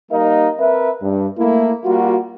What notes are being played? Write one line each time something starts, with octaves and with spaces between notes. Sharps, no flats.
G3 A#3 D#4 A#4 D#5 F5
C4 A#4 B4 E5
G2
A3 A#3 E4
G3 A#3 F4 F#4